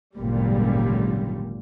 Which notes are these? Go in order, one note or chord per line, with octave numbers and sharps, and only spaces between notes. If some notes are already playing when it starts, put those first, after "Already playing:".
G#1 C#2 F#2 A#2 D3 G3